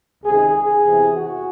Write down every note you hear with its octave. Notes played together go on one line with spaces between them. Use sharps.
C#2 C3 D#3 G#4
G#4
E2 C3 E3
F#4